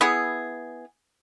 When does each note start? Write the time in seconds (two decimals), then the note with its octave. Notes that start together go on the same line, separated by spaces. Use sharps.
0.01 B3 E4 G#4